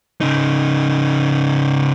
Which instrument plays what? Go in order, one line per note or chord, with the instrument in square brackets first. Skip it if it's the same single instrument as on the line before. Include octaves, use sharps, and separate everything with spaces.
[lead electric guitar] C#3 D#4